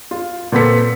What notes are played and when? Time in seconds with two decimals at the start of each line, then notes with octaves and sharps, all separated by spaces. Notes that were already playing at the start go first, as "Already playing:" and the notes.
0.11 F4
0.52 A#2 B3 C4 A4 B6 C#7